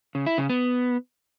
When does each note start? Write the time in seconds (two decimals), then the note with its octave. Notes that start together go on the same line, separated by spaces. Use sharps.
0.15 C#3
0.26 E4
0.38 C#3
0.50 B3